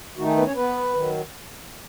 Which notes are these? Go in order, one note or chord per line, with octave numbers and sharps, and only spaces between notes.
D#3 A3 D#4 F#4
G#4
B3 B4
C#4 C#5
B3 B4
D#3 F#3